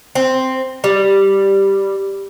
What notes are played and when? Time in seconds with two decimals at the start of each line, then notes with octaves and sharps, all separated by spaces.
0.15 C4
0.84 G3